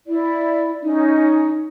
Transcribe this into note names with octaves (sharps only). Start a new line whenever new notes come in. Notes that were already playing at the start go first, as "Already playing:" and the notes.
E4 D5
C#4 D#4